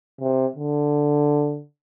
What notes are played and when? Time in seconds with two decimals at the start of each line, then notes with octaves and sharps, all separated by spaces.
0.20 C3
0.56 D3